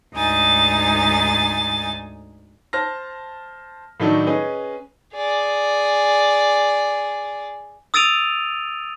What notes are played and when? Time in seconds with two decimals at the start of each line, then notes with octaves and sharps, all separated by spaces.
0.16 D2 G#2 D#4 G#5 A6
2.73 C5 A5 F6 A#6
4.00 A2 D#3 F#3 A3 D4 D#4
4.27 C#4 G#4 B4 D#5
5.15 G#4 D5
7.94 D#6 E6 A6 D7 D#7 F7